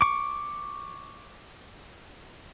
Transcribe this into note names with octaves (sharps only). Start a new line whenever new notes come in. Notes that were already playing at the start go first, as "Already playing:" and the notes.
C#6 D6